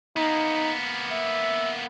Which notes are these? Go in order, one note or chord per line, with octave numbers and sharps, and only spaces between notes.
A#3 B3 D#4
E5